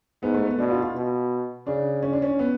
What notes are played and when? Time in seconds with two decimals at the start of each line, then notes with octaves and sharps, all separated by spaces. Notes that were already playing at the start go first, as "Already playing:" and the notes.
0.22 G#2 B3
0.34 A3
0.46 B3
0.58 B2 D4
0.71 F4
0.82 F4
0.95 B2
1.67 C#3 D4
2.03 C#4
2.13 D4
2.22 C#4
2.39 B3